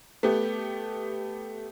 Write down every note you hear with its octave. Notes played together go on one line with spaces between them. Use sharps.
A3 B3 G4